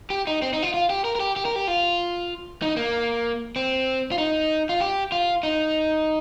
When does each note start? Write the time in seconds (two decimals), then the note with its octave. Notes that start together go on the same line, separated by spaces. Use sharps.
0.10 G4
0.27 D#4
0.42 C4
0.53 D#4
0.63 F4
0.74 F4
0.90 G4
1.04 A#4
1.15 A#4
1.20 G4
1.36 G4
1.45 A#4
1.56 G4
1.68 F4
2.62 D#4
2.77 A#3
3.56 C4
4.12 F4
4.18 D#4
4.69 F4
4.80 G4
5.12 F4
5.43 D#4